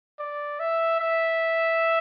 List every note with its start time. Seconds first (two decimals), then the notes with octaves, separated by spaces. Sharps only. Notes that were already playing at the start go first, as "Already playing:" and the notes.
0.19 D5
0.60 E5
1.00 E5